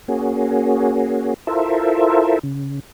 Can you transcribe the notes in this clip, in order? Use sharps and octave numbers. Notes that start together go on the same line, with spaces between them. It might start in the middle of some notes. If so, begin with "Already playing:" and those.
A#3 C#4 F#4 G#4
E4 F4 A4 A#4 C5 E5
C#3